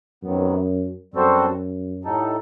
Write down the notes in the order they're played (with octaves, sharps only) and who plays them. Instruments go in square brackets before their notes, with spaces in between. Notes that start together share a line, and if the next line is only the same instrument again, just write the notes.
[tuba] F#2 [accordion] C3 D#3 F#3 B3
[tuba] F#2 [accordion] G3 C4 F#4 A4 C5
[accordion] A2 G3 D#4 A4